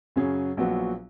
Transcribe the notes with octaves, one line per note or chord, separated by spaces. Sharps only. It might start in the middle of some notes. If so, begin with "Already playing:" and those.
F#2 C#3 F#3 C#4 G#4
A#1 A#2 F#3 B3 F#4